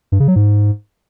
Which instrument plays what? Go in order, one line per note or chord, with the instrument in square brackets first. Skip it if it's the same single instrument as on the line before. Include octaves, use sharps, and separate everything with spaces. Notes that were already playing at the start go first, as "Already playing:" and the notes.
[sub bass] G2
C#3
F#3
G#2